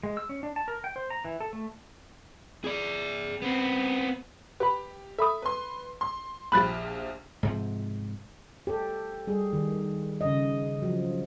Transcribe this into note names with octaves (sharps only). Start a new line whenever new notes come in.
G#3
E6
C#4
D4
A5
A#4
G5
C5
A#5
E3
A4
A3
G#4 D5
B3 C4
G4 B4 B5
A4 E5 B5 D#6
B4 C6
C6
A#1 F3 G4 B5 F#6 A6
G#2 C3 F3
G4 A4
G3 G#4
D#3
C#3 D#5
F3 F#3